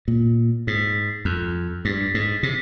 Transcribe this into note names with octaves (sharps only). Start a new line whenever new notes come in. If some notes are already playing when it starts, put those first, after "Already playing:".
A#2
G#2
F2
G2
G#2
C3